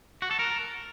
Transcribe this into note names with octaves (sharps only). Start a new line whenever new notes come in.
F#4
A4
A#4